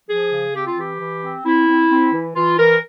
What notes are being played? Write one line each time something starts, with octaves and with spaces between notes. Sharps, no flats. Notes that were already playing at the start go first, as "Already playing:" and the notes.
F3 G#4
C#3
C4 G4
F4
E3 G4
E3
C4
C4 E4
C4
C4
E3
E3 F4
E3 A#4